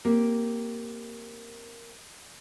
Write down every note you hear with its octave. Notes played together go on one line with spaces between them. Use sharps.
A#3 C4 G4